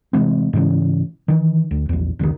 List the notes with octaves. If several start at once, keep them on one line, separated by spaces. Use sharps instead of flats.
C3 E3 G#3 C4
G#2 C#3 E3 C#4
D#3 E3
D2
A#1 E2
F1 C#2 A2 D#3